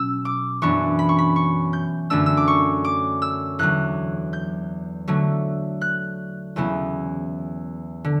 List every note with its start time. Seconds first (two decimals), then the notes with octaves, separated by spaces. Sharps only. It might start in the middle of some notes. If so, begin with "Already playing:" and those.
Already playing: B2 F#3 C#4 E6
0.25 D6
0.62 F#2 E3 B3 D4 C#6
0.99 B5
1.09 C#6
1.19 B5
1.36 C#6
1.73 G6
2.10 F#2 D3 A3 D4 E6
2.26 E6
2.37 D6
2.48 C#6
2.85 D6
3.22 E6
3.59 E2 D3 F#3 F#6
4.33 G6
5.08 D3 F#3 A3
5.81 F#6
6.56 E2 C#3 F#3 B3 E4
8.04 D3